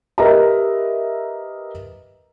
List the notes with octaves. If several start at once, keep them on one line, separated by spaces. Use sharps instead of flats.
G4 A#4 B4 D#5 E5 A#5